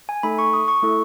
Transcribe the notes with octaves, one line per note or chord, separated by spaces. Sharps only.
G#5
A3 D#4 A4 B5
C#6
D#6
C#6
A3 E4 A4